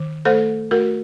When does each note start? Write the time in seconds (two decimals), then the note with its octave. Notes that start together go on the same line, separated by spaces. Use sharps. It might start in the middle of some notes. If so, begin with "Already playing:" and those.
Already playing: D#3
0.25 A3 A4 C5
0.71 A3 F#4 A#4